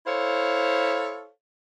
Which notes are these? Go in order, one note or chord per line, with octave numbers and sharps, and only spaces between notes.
E4 A4 C5 C#5 F5